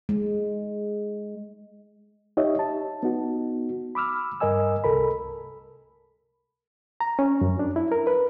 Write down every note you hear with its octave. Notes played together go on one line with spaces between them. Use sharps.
G#3
D#4 G4 C#5 D#5 E5
A5
B3 D#4 F#4
B5 D6 E6 F6
G2 A#4 D#5 G#5 E6
C2 A4 A#4 B5
A#5
C#4
F#2
D4
E4
A#4
B4